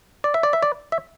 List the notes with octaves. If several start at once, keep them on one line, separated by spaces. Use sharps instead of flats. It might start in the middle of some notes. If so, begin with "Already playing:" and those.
D5
E5
D5
E5
D5
E5